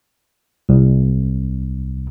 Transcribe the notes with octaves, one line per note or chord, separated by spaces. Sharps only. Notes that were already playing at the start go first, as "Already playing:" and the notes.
C2